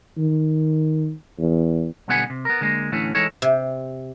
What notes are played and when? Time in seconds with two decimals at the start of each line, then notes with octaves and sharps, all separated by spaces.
0.18 D#3
1.38 E2
2.08 B1 D3 G3 B3 F#5 G#5
2.30 C3
2.45 B3 A#4
2.61 D3 G#3 A#3
2.92 A2 D3 E3 A3 C#4
3.15 E3 G#3 D#4 A4 C#5
3.42 C3